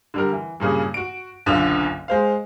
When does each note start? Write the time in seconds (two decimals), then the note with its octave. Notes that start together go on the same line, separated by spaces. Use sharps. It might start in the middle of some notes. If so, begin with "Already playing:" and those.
0.14 D3 G3 A#4
0.33 E3
0.60 G2 A#2 C#3
0.94 F#4 D7
1.46 F#1 B1 F#2 D3 F4
2.08 G#3 C5 F5